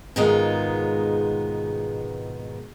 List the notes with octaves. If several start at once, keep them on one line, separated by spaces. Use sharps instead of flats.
G#2 B2 D#3 G#3 B3 F4